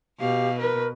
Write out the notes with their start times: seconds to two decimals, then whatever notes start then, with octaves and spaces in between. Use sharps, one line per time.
0.20 B2 G4 F5
0.59 A#4 B4